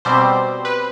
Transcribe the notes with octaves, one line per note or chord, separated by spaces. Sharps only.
B2 G3 C4 C5
B4